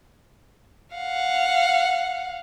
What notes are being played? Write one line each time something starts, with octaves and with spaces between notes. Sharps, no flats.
F5 F#5